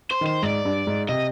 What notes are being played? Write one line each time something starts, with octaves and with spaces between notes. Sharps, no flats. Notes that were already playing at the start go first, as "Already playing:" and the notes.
C5
D#3 C5
G#2 D5
G2
G#2
C3 D#5